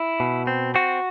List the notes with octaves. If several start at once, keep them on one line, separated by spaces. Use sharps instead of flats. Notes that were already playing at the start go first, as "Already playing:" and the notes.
Already playing: E4
B2
C4
C4 F#4